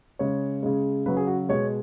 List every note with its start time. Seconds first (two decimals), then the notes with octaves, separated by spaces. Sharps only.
0.19 C#3 G#3 C#5
0.63 C#3 G#3
1.06 C#3 F#3 B4
1.17 G#4
1.27 F#4
1.49 B2 G#3 C#5